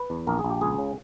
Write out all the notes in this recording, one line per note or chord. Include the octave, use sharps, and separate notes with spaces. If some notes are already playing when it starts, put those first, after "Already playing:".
Already playing: B4
E2
A#1 A#4
G#4
A#1
G4
C#2 G#4
C#3